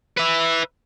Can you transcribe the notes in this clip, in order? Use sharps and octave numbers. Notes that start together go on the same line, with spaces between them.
B4 E5